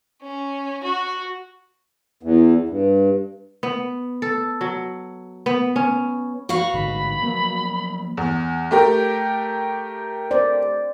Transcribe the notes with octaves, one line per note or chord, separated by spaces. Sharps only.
C#4
F#4
E2
G2
B3
A4
F#3
B3
C#4
F#4 B4 F5 C#6
A1 G#2 D3 B5
F3 F#3 A#3
E2
A3 G4 A#4
C5 D5